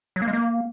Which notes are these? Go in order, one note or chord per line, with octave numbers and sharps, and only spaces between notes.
F#3
A#3
G#3
A#3